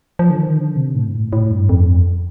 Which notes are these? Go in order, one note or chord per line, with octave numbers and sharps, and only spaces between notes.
F3
D3
D#3
D3
C3
A2
G2
A2
A2
G2
F2